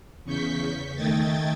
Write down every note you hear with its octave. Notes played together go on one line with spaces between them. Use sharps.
E2 C#3 C#6 G6 B6
D#3 A3 D#5 G5 G#6 A6